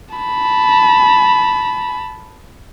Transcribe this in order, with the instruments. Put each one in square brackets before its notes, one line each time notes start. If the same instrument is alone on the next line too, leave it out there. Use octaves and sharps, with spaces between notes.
[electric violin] A5 B5